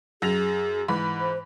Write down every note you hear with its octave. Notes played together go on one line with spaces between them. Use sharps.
F#2 G#4 A#6 F7
G#2 E3 B5
C5